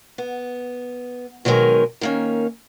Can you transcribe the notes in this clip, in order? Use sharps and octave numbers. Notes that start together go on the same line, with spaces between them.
B3
B2 D#3 F#3 G#3 A#4 G#5
D#3 A#3 C#4